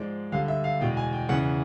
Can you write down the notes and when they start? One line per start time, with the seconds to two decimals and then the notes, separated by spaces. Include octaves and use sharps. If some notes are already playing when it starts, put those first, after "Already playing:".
Already playing: G#2 F3 G#3 D5
0.32 G2 D3 G3 F5
0.48 E5
0.64 F5
0.80 E2 B2 G#3 G5
0.97 G#5
1.13 G5
1.29 E2 C#3 E3 F#5